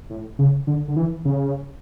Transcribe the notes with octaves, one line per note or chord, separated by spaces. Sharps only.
A2
C#3
D3
D3
E3
C#3